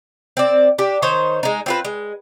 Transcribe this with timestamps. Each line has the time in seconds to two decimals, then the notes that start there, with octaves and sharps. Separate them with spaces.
0.37 C4 D5
0.78 D4 G4
1.02 D#3 D#4 C5 C#5
1.43 G#3 D#4
1.66 C4 F4 B4
1.85 G#3